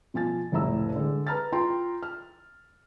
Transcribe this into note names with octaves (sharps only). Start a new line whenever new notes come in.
B2 F3 G#5 A6
F1 C#2 A2 E4 A#5 E6
D3 G#3
B4 A#5 F6 A6
F4 G5 A#5 C6
F6